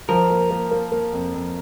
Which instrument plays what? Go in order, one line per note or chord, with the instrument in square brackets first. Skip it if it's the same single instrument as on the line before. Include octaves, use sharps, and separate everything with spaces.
[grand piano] F3 [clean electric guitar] A#4
[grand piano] A#3
A#3
A#3
A#3
F2
F2